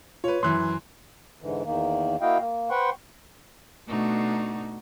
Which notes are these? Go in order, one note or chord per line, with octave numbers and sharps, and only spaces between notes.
F4 B4 C#5
F#2 E3 C6 F#6
G#2 D3 E3
E2 D#3 A#3
A#3 E4 F#4 D#5 F5 G5
A#3
B4 C5 F#5 G5 C6 C#6
B2 A3 D4 D#4 F#4